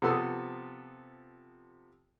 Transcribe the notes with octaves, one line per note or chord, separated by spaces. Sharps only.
C3 F3 B3 A4 C6 D#6